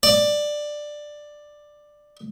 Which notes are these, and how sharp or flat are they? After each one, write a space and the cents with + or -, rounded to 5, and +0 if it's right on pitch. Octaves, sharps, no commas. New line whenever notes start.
D5 +10